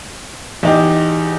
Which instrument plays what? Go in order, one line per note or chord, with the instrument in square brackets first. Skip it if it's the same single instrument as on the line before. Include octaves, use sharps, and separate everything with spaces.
[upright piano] E2 D#4 G4